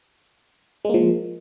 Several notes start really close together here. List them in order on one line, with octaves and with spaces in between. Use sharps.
G#3 A#3 F3